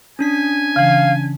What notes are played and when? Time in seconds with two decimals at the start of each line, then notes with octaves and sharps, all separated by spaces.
0.19 C#4 D4 G#5 B6
0.76 C#3 E3 F5